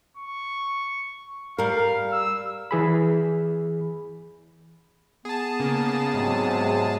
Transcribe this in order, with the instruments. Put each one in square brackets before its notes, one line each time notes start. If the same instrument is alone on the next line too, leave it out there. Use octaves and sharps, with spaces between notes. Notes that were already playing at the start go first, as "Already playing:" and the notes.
[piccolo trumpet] C#6
[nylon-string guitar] G3 A#4 [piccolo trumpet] F5
[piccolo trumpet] E6
[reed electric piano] E3 G#4 B5
[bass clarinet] B3 [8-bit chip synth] G#4 A5
[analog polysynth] C#3 A#3
[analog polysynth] G#2 [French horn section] C3 F#3 G#3